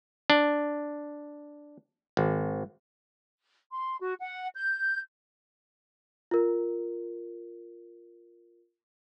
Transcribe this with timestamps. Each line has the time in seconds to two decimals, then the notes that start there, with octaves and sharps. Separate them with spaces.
0.30 D4
2.17 G#1
3.71 C6
4.00 F#4
4.20 F#5
4.56 G6
6.31 F4 A#4